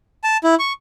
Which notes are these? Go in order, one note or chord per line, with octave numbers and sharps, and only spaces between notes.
A5
E4
C#6